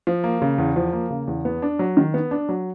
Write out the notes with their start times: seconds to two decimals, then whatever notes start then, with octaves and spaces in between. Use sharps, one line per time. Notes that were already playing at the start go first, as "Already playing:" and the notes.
0.07 F3
0.24 A#3
0.42 C#3
0.58 E2
0.76 F3
0.93 A#3
1.10 C#3
1.27 E2
1.45 B3
1.62 D4
1.79 F#3
1.97 D#3
2.14 B3
2.31 D4
2.49 F#3